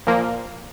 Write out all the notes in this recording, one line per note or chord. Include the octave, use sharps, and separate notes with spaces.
A#2 F3 A#3